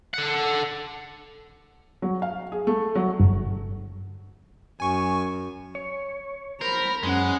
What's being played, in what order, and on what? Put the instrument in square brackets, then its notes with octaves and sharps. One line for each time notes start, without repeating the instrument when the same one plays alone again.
[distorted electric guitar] A4 F#5
[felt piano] F#3
F5
G#4
A3
F#3
[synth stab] G1
[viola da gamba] F#2 [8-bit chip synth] G#5 C#6
[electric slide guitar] C#5
[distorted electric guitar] A#4 [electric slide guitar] C5 [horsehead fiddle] A#5 B5
[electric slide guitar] F#2 [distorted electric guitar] G#3 [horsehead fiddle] C#4 F#5